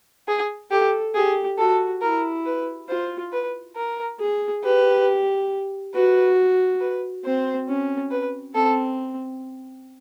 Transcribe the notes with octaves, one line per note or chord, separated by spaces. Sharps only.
G#4
G4 A4
G4 G#4
F#4 A4
E4 A#4
B4
F4 C5
B4
A#4
G#4
G4 B4
F#4 B4
B4
C4 C5
C#4
B4
C4 A4